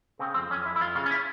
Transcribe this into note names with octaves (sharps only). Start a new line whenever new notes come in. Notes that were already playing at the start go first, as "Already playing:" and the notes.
C#3 C4
F2 C4
F2 C#4
F2 E4
E4
F2 F4
C#3 F4
C#4
E4